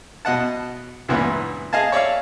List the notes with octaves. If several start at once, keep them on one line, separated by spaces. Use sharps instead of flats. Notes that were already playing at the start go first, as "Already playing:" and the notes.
B2 D#5 F#5 A5
C#2 G2 A#2 E3 B3
G#4 D#5 F5 G#5 A5
C#5 D5 E5 F5